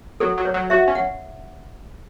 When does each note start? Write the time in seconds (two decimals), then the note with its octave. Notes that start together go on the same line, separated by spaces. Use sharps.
0.20 F#3 A4
0.38 F#3
0.45 C#5
0.54 F#3
0.70 F#4 E5
0.88 C#4
0.95 F#5